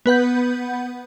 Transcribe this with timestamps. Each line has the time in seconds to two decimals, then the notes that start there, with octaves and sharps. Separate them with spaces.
0.06 B3 B4 F#5 G6